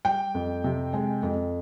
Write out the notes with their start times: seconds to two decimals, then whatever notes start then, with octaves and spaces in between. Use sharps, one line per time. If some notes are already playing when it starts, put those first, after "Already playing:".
0.05 G3 G5
0.34 F2
0.64 C3
0.93 G#3
1.23 F2